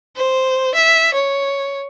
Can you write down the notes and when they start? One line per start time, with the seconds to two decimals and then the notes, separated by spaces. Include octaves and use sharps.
0.16 C5
0.74 E5
1.14 C#5